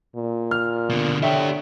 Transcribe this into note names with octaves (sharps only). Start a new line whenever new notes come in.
A#2
F6
B2 D3
D3 G4 C#5 E5 G5